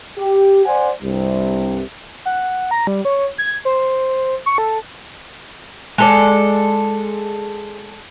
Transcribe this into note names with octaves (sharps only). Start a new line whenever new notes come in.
G4
C5 D5 F#5 G#5
C2 G2 C3
F#5
A#5
G3
C#5
G#6
C5
C#6
A4
G#3 A4 D5